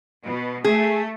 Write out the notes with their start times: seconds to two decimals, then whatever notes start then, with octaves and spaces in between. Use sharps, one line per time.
0.24 B2
0.64 A3 G#4